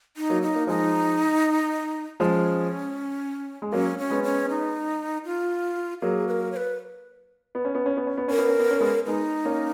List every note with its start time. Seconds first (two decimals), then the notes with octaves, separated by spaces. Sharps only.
0.17 D#4
0.30 F#3 A#3
0.42 D#4
0.55 A#3
0.67 F3 G#3 D#4
2.20 F3 G#3 D#4
2.25 C#4
3.62 G#3
3.72 F#3 A#3 C#4
3.98 C#4
4.10 G#3 B3
4.23 C#4
4.49 D#4
5.25 F4
6.02 F#3 A#3 G#4
6.27 B4
6.31 A#4
6.52 C#5
6.56 B4
7.55 B3
7.65 C#4
7.75 B3
7.86 C#4
7.97 B3
8.07 C#4
8.18 B3
8.28 C#4 A#4
8.38 B3
8.49 C#4
8.59 B3
8.71 C#4
8.80 G#3 B3
9.06 G#3 B3 D#4
9.45 A#3 C#4